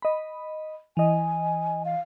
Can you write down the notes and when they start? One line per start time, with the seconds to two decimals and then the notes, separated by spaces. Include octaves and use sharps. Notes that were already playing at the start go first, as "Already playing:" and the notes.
0.02 D#5 B5
0.97 E3 D#5 G#5
1.85 F5